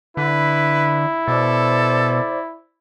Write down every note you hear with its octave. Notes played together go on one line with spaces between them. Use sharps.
D3 E4 B4
B2 A4 C5 D5 D6